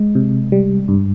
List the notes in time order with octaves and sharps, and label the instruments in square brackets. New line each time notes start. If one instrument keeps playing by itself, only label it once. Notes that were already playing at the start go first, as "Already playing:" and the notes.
Already playing: [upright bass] G#3
[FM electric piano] C3
G3
G2